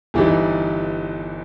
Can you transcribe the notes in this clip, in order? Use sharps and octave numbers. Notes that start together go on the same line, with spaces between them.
G1 G2 E3 G3 D#4